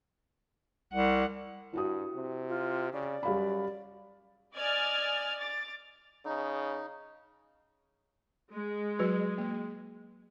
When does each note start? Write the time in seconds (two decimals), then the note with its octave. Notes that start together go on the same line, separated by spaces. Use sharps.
0.93 C2 F#5
1.73 G2 E4 F#4 D#6
2.15 C3
2.49 F4
2.93 C#3 D5
3.23 F#2 G3 F5 B5
4.56 D5 D#5 G#5 F6 G#6 A6
5.39 D6 A6
6.25 C#3 D#4
8.52 G#3
8.99 F#3 F#4 B4
9.38 A#3